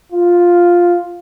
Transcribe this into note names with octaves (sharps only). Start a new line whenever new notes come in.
F4